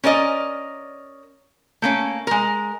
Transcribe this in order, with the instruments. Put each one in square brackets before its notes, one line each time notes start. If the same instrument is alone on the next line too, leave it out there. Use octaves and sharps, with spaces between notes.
[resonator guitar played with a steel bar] C#4 A#4 D5 D#5
A3 A#3 C#4
G#3 A#4